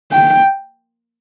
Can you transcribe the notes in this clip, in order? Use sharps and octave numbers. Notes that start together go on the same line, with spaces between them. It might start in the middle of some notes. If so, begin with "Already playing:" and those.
G5